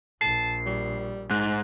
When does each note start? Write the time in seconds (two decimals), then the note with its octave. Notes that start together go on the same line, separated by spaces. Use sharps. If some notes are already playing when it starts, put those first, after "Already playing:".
0.21 A#1 A5 C7
0.66 G3
1.31 G#2 F#6